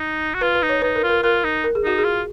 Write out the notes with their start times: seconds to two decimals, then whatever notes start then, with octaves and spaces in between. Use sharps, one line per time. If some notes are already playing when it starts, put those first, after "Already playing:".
Already playing: D#4
0.34 F#4
0.41 F4 B4
0.55 B4
0.62 D#4
0.69 C#5
0.82 D#4 B4
0.96 A#4
1.03 F4
1.09 A#4
1.23 F4 A#4
1.44 D#4
1.64 A#4
1.75 G#4
1.84 D#4 F#4
1.98 G#4
2.04 F4